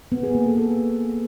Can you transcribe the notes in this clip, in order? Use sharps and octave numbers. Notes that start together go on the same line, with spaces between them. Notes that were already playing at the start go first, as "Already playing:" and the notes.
B3
G#4
A#3
A4
A4